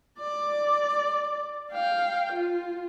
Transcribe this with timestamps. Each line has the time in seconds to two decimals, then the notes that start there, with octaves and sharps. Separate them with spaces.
0.20 D5
1.72 F5 G5
2.33 F4